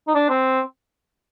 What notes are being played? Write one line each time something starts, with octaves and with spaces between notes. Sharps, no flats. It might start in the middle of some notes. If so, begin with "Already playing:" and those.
D#4
D4
C4